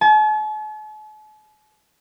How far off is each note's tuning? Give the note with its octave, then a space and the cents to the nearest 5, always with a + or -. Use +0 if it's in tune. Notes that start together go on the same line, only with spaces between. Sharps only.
A5 -45